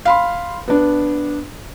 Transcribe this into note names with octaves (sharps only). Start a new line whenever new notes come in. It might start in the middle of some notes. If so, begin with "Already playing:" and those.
F5 B5 C6
B3 D4